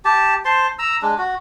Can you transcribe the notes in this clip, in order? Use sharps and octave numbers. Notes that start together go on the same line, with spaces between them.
G4 A5
C5 A5 C6
A#5 E6
G#3 D4
F#4